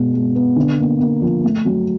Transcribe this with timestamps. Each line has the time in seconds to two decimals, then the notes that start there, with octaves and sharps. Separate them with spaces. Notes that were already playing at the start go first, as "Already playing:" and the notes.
Already playing: B2 G#3
0.14 G#3
0.35 B3
0.56 D3
0.78 A#3
1.00 A#3
1.22 F3
1.43 A3
1.65 F#3